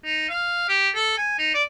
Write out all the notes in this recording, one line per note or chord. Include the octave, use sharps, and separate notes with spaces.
D#4
F5
G4
A4
G#5
D#4
D5